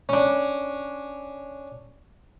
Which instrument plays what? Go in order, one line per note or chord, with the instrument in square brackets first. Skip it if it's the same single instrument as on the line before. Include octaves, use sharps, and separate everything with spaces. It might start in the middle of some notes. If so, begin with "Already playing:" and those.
[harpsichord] C#4 D4